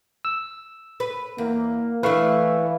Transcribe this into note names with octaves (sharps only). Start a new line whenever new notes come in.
E6
B4
E2 A#3
E3 A3 D4 E4 B4 F5 C#6